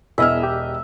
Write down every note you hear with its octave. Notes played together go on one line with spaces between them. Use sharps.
E1 B3 E4 G#4 D#5 E5 F6
G4